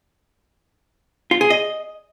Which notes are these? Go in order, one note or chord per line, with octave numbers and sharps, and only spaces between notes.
F4
G#4
D#5